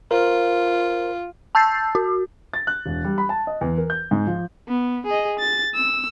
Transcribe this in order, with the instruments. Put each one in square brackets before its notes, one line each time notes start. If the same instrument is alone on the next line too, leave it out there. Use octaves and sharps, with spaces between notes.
[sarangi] F4 [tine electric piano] A#4 C5
[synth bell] A5 E6 G6 A6 C7
F#4
[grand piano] A6
F#6
E1
G3
B5
A5
D#5
E2
A#4
G6
G#2
F3
[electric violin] B3
G#4 D#5
A6
E6